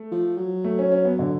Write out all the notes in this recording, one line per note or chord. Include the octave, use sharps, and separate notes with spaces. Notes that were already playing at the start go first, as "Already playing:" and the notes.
Already playing: A3
F3
F#3
A3
C#4
C#4
B3
D3